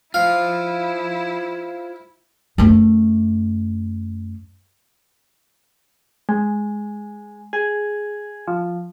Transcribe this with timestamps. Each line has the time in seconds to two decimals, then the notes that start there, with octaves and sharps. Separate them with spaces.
0.14 E4 F4 C5 F5
2.58 F#2 A3
6.29 G#3
7.53 G#4
8.48 F3